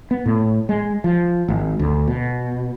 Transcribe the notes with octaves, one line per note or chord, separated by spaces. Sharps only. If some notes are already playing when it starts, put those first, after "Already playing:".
B3
A2
G#3
F3
G#1
D2
B2